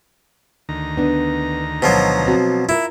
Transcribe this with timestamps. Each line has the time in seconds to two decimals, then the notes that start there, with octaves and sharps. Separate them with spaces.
0.69 D2 D#3 A#5
0.97 B3 D4
1.82 B2 F3 F#3 C5
2.27 C4 F#4
2.69 E4 F4 A#4